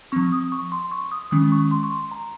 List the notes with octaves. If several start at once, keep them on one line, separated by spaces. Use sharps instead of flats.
F3 C4 C#6
D#6
C#6
C6
C#6
D#6
D#3 G#3 C#4 D#6
C#6
C6
C#6
C6
A#5